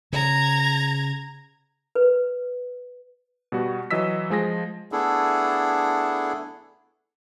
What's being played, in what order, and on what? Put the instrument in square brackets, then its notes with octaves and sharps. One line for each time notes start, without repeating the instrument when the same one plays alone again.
[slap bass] C#3 [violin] A#5 G#6
[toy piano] B4
[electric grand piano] B2 G3 F#4
E3 F#3 D#5 E6 B6
F3 G#3 G#4 A#6
[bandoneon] A3 B3 D4 E4 G#4 A4